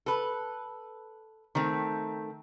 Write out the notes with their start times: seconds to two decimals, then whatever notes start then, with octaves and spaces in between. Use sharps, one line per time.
0.06 A4 B4
1.55 D#3 A3 C4